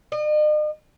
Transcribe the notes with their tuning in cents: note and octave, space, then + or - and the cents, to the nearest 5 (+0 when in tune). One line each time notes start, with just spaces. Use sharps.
D#5 -45